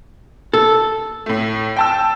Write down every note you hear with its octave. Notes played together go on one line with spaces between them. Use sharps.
A4
A2 A3
G5 A5 E6